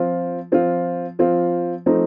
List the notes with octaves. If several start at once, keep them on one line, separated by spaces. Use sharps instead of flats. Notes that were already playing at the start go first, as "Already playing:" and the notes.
Already playing: F3 C4 F4
F3 C4 F4
F3 C4 F4
F3 A3 C4 D#4